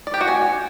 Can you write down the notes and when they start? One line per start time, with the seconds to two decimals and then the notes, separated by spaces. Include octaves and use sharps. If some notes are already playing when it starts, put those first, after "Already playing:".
0.07 D5
0.14 G4
0.21 F#4
0.28 G#5